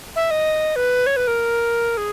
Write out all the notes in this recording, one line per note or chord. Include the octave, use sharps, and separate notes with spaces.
E5
D#5
B4
C#5
B4
A#4
G#4